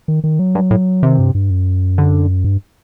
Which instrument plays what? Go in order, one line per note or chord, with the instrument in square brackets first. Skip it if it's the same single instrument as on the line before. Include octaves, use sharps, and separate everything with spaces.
[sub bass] D#3
D#3
F#3
[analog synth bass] G2
A2
[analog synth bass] C3 [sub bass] D#3
[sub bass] G2
G2
F#2
[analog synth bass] D3
[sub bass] G2